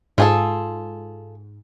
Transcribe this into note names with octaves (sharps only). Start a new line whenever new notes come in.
G#2 F4 G#4 A4